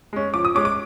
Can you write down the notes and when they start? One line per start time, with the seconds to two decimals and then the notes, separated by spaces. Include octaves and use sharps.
0.13 G#3 C#4
0.34 F3 D6
0.45 D#6
0.55 G#3 C#4 D6
0.65 D6